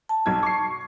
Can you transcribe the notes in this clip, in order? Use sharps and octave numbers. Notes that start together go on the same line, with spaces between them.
A5
B1 F#3 G#6
C#6 C7